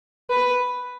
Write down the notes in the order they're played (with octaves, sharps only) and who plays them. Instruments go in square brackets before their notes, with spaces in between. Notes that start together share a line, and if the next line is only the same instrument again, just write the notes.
[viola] B4